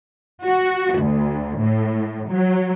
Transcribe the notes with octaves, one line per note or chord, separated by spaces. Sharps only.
F#4
D2
A2
F#3